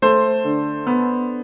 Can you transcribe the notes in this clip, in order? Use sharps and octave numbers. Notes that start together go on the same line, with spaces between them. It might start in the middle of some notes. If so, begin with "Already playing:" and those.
A3 C5
D3
B3